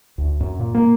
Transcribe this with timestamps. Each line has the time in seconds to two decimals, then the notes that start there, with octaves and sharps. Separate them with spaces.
0.18 D2
0.40 F#2
0.59 A#2
0.74 A#3